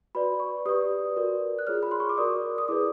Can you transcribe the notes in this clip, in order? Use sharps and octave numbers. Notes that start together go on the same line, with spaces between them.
F#4 B4 D5 B5
C#6
G4 B4 D5 D#6
F#4 A#4 D5
F#6
F4 G#4 C#5 F6
B5
C6
C#6
D6
F#4 A#4 D5 D#6
D#6
E4 G#4 B4 D5 D6